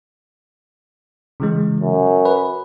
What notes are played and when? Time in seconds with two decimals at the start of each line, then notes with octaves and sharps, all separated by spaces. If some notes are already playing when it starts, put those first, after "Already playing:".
1.40 C#3 E3 G#3
1.81 F#2
2.25 B4